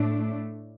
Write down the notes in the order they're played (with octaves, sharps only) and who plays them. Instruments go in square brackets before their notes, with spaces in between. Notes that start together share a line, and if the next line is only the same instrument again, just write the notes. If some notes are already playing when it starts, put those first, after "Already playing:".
Already playing: [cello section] A2 A3 D4